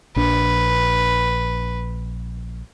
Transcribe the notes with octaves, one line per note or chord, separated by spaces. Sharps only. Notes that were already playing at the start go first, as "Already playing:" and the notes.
A#1 D4 B4